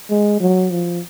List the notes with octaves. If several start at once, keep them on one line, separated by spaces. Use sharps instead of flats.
G#3
F#3
F3